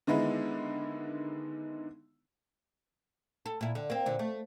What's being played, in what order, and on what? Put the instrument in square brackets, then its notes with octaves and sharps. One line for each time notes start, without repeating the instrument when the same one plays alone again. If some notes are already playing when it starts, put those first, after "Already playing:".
[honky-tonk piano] D3 D#3 G#3 B3 D#4 E4
[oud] A4
A#2 E4
D3
A#3 C4
A#2 D3
A3